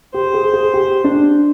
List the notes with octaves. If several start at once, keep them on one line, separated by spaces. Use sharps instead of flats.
G4 C5
G#4
G#4
G4
D4